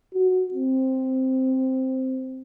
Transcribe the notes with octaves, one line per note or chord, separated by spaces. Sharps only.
F#4
C4